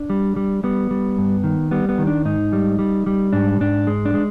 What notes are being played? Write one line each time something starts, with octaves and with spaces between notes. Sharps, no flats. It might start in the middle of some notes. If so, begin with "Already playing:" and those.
Already playing: D4
G3
G3
G3 B3
G3
G2
D#3
G3 B3
B3
D#3
D4
G#2 D#4
G3
G3
G3
G#2 D4
G#2 D4
G#3
D4
G#3